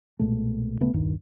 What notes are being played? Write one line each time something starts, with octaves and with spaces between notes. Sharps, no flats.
B1 A#2 G#3 A3
D#1 C#3 A3 B3
D#1 C2 G2 D#3